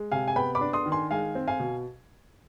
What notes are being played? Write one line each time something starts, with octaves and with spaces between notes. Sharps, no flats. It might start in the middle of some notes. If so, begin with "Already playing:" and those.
Already playing: G#3
C3 F5 G#5
G#5
B3 G5 B5
B5 D6
D4
C6 D#6
D#3
G#5 C6
G#3 F5 G#5
C4
F5 G#5
B2